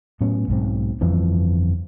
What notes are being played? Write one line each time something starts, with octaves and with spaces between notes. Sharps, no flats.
A2 F#3 B3 C#4
B1 G#2 C4
G1 F2 E3 F3